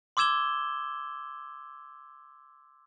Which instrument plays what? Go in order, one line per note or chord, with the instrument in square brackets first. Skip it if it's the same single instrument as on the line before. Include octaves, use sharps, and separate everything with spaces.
[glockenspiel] C6 D6 E6 G#6 E7 G7